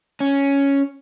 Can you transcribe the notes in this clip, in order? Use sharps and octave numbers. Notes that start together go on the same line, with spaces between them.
C#4